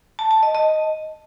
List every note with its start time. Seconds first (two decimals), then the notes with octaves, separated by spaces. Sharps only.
0.19 A5
0.31 A5
0.43 D#5
0.55 D#5